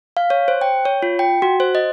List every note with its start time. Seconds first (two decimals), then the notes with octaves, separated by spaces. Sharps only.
0.17 F5
0.30 C#5
0.48 C5
0.61 G5
0.85 C#5
1.02 F4
1.19 G5
1.42 F#4
1.60 C5
1.75 D#5